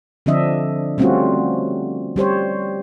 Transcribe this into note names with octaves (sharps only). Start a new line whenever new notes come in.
D3 F3 C4 D4 D#5 E5
G3 A3 C4 C#4 F4 F#4
G3 G4 C5 C#5